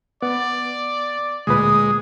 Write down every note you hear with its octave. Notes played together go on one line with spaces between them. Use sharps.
B3 D5
D2 A#2 G#3 B4 D#6